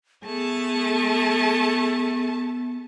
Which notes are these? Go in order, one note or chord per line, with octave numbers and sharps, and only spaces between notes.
A3 B3 G#4 A5